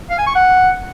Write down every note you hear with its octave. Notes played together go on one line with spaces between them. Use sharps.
F5
G#5
C#6
F#5